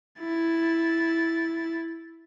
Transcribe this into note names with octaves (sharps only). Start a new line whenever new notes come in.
E4 A6